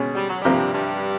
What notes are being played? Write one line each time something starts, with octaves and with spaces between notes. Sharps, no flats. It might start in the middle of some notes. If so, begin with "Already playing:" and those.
Already playing: B2 G#3 C#4
G3
F#3
G2 C3 F3 G3 A#3
G2 G3